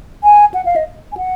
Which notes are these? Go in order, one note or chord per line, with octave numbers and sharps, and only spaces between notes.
G#5
F#5
F5
D#5
G#5
F#5